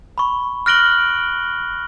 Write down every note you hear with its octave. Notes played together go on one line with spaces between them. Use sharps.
B5 C#6
F6 F#6 A#6 D7 F#7 G7